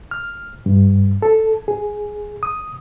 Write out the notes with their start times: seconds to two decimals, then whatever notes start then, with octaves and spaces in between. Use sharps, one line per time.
0.11 F6
0.66 G2
1.22 A4
1.68 G#4
2.43 D#6